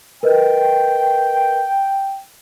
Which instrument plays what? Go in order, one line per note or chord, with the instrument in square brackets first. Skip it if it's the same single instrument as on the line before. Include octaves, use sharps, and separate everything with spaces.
[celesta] A#4 B4 D#5 [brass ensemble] G5